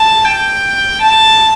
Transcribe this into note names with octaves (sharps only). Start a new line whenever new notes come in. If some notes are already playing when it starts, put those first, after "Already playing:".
Already playing: A5
G5
A5